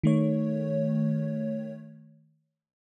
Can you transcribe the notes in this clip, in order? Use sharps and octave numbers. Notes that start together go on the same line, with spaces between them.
D#3 A3 C#5